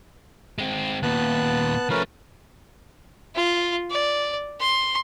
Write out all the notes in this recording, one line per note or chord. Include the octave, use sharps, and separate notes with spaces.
G#3 C4
D#2 A#2 B3 A5 F#6
F3 A3 C#4 A#4 B4
F4
D5
C6